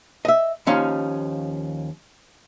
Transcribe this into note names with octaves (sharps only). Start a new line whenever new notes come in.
D#5 E5
D#2 F3 C#4 D#4 F5